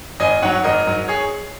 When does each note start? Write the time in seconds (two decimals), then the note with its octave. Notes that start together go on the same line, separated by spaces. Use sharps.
0.20 G#1 D#5 G#5
0.42 G#2 F#3 C#5 F#5
0.64 G#1 A#4 D#5
0.87 G#2 F#3
1.08 G#4 C#5